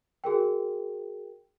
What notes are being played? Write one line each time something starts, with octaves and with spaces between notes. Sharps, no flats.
F#4 G#4 A#4 G5